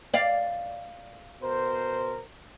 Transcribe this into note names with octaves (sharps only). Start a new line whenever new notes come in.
D5 F5
B2 A#4 C5